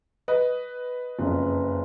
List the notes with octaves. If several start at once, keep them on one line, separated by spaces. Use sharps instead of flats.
B4 D#5
F#1 F2 C#3